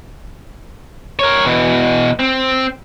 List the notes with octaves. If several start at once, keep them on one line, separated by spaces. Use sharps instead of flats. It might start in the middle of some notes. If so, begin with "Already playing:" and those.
A#4 C#5
B2 E3
C4